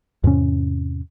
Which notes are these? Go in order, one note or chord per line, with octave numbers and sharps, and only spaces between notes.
E2 G#2 C3 C#4